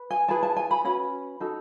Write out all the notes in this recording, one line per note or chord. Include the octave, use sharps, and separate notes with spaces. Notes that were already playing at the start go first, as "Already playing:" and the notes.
Already playing: B4
G#5
E4 G#4 B4 A5
A5
G#5
B5
C#4 F#4 B4 B5
D#4 F#4 A4